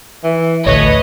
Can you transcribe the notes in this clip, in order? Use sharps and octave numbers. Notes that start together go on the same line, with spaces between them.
E3
A1 D2 A3 B4 C#5 D#5